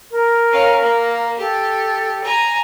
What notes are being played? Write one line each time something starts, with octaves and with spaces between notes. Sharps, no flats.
A#4
C#4 F5
A#3
G4 A4
G#5 A#5